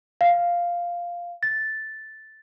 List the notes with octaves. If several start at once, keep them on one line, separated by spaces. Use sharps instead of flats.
F5
A6